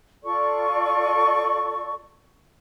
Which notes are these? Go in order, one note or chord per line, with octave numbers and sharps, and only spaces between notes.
F4 A4 D5 C#6